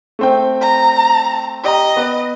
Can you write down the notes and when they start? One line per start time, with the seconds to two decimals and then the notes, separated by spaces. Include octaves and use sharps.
0.19 A3 C4 G5
0.61 A#5
1.64 G4 D#5 G5 A#5
1.97 B3